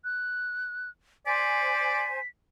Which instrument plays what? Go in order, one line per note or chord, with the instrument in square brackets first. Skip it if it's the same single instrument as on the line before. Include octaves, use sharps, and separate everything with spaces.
[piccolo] F#6
[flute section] C5 G#5 [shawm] D5 [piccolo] B6